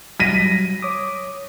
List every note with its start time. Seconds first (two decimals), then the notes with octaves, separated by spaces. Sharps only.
0.20 F#3 G3 A#6 B6 D#7
0.82 C#5 D6 D#6